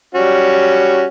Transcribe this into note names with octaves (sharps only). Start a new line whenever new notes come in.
G3 C#4 F#4